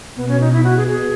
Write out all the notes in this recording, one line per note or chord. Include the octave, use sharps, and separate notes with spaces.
B2 B3
C#4
D#4
E4
F#4
G#4
G#4